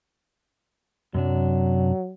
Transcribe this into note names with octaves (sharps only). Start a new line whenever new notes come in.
F#2 C3 F#3 D4